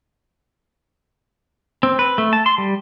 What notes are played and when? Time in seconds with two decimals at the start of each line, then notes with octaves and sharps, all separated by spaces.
1.83 C4
1.99 B4
2.18 A3
2.33 A5
2.46 C6
2.58 G3